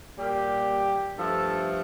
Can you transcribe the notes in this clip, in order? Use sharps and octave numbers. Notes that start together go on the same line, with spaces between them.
A#2 G3 A#3 G4
G2 F3 A3 A4